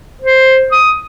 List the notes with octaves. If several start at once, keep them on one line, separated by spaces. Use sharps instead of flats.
C5
D#6